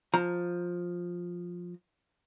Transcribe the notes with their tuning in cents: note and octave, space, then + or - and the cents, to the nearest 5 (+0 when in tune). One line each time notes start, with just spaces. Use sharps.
F3 +10 A#5 +0